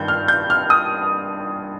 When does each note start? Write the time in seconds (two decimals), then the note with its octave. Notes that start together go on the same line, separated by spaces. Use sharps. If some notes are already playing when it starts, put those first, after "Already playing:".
Already playing: G2 D#3 G6
0.08 F6
0.28 G6
0.50 F6
0.70 D#6